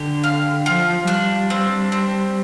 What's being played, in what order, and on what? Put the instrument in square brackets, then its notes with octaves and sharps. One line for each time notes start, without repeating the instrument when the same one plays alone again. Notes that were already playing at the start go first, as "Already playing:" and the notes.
Already playing: [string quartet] D3 [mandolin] G4
[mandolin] F5
[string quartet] F3 [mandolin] F4
[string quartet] G3 [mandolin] D4
[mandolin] C4
C4